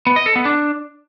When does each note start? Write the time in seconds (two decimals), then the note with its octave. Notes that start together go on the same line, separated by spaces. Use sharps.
0.07 B3
0.16 D#5
0.26 A4
0.36 B3
0.45 D4